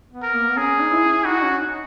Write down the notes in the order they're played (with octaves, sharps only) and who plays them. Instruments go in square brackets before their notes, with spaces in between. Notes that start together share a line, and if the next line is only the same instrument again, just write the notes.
[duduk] B3
[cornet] A#4
[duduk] A#3
B3
[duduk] C#4 [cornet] G#4
[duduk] D#4
E4
[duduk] D#4 [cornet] F#4
[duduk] C#4
D#4